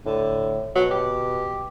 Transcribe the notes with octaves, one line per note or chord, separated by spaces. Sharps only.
A2 D3
B2 F#3
G4